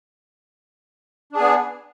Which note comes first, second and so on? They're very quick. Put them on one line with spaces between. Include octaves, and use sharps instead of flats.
D4 G#4 B3